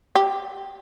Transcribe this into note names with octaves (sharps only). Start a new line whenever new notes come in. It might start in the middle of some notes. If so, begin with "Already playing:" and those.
G4